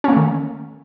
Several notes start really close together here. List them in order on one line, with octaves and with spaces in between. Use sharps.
C#4 A#3 A3 D#3